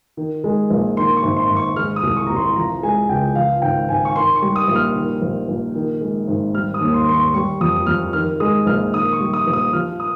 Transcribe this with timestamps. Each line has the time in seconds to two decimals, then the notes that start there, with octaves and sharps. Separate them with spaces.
0.17 D#3
0.44 G#3
0.70 A#1
0.97 D#3 C6
1.17 C#6
1.23 G#1
1.36 C6
1.49 G#1
1.56 C#6
1.76 G#3 F6
1.96 D#6
2.03 C2
2.17 C#6
2.27 C2 A#5
2.36 C6
2.56 F3 A#5
2.83 G#3 G#5
3.09 C#2 G5
3.35 F3 F5
3.62 G#1 G5
3.89 G#1 G#5
4.05 C#6
4.16 D#3 C6
4.36 C#6
4.42 G3
4.56 D#6
4.68 A#1
4.76 F6
4.95 D#3
5.22 A#1
5.48 A#1
5.75 D#3
6.01 G#3
6.28 G#1
6.54 G3 F6
6.74 D#6
6.81 D#2
6.94 C6
7.08 D#2 C6
7.14 C#6
7.34 G3 C#6
7.61 F2 D#6
7.87 F2 F6
8.13 D#3 F6
8.40 G#3 D#6
8.66 A#1 F6
8.94 D#3 D#6
9.13 C#6
9.20 G3
9.34 D#6
9.47 A#1
9.53 D#6
9.73 F3 F6
10.00 D#6